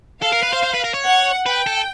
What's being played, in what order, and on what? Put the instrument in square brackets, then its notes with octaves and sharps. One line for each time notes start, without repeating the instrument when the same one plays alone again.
[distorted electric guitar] A4 [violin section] F5
[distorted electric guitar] A#4
B4
C5
C5
B4
A#4
C#5
[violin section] F#5
[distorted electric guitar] B4 [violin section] G5
[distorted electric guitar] A4